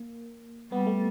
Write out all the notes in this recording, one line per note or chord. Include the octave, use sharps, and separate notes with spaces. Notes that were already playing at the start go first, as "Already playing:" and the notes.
Already playing: A#3
G3 B3
A3